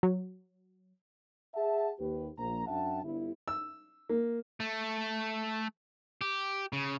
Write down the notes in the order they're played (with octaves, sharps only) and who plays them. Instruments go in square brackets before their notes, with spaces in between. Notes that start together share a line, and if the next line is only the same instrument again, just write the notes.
[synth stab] F#3
[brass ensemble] G#4 E5 F#5 A5
D#2 G4 B4
A#1 A#5
F#2 D4 E5 F#5 G5 A5
G1 E4
[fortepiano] E6
A#3
[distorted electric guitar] A3
G4
C#3